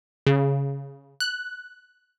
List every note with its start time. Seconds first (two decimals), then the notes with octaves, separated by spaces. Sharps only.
0.26 C#3
1.20 F#6